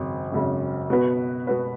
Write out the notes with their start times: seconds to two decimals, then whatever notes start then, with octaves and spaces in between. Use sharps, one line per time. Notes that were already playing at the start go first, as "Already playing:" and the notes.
Already playing: G#1 F#2 C#3
0.32 G#1 F#2 C#3
0.90 B2 B3 F#4 B4
1.47 B2 B3 F#4 B4